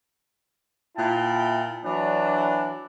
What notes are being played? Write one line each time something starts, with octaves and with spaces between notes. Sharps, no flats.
A#2 E4 G5 A5
E3 F#3 D4